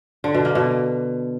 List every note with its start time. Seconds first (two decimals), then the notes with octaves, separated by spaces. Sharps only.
0.24 D3
0.34 B2
0.45 A#3
0.55 B2